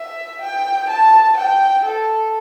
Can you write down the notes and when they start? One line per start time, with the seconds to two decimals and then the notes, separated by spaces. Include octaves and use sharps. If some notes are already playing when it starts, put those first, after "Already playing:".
Already playing: E5
0.42 G5
0.90 A5
1.37 G5
1.85 A4